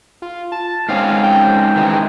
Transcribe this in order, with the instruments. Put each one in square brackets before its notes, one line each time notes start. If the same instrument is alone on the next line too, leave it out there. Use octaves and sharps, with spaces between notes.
[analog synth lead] F4
A5
[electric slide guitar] G#2 C4 C#4 [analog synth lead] F5
[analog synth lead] G5
[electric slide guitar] D#3 E3 G#3